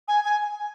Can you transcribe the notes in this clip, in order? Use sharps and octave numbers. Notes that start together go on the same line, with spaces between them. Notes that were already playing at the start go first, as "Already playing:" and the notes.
G#5
G#5